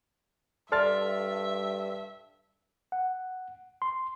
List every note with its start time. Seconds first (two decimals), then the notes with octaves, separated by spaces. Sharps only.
0.72 G2 A4 D5 E5 A5 C6 F6 A6
2.92 F#5
3.82 C6